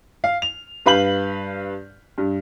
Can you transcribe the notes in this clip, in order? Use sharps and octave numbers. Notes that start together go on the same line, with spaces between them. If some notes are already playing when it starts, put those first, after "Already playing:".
F5
F7
G2 B4 F5 B5 G6 F#7
G2